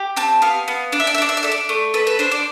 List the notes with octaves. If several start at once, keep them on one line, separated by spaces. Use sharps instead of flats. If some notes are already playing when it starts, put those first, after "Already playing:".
Already playing: G4
C4 A5
B3 F5
B3
D4 D5
E5
D5
E5
D4 D5
E5
D5
A4 E5
D5
A3
A4 B4
B4
D4 C5
D5